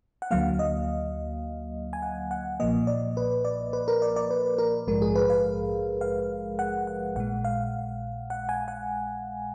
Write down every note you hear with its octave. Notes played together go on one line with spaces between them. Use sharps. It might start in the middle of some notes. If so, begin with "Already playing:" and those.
F#5
D2 D3 F#3 A#3 F5
D#5
G#5
F#5
F#5
B1 A#2 F3 A#3 D#5
D5
B4
D5
B4
A#4
D5
D5
B4
A#4
A#1 G#2 F3 G#3 A#4
G#4
B4
F5
F5
F#5
F#5
A#1 A#2 G#3 F#5
F5
F#5
G#5
F#5